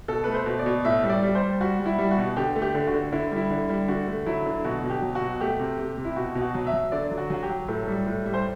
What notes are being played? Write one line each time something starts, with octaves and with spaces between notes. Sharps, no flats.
B2 A4
A3 B4
C5
B2
D5
B2
A2 E5
G3
D5
G3
C5
G3
G3 F#4
G3
E4
G3
F#4
B2
D3 G4
A3
G4
D3
F#4
D3
D3 E4
G3
E4
D3
G3
D3 F#4
A3
F#3 E4
D3
B2 F#4
B2
G4
F#3
F#4
B2
A3 G4
C3
C3
C3
E4
B2 F#4
B2
F#4
F#3
E5
F#3
D3 D5
F#3
F#4
F#3 F#4
G4
F#3
A2 A4
G3
A2
G3
C5